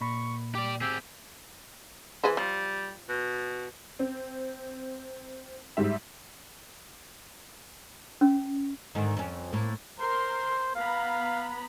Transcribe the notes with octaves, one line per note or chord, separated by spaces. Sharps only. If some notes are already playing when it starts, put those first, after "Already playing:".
A#2 B5 C#6
G4 D5 D6
C4 G4 G#4 E6
E3 G#4 B4 C5
F3 G3
B2
C4
G#2 G3 E5
C#4
G#2 D3 D#3
F2 C#4
A2 A#3
A#4 C5 C6
B3 F5 A#5 B5